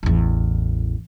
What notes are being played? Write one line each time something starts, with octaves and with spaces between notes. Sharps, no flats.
A1 E2